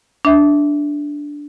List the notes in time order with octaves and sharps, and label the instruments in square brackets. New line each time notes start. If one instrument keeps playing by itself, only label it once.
[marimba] D4 E5